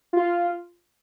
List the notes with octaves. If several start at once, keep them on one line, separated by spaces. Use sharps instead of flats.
F4